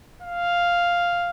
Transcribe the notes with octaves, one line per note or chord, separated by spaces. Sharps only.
F5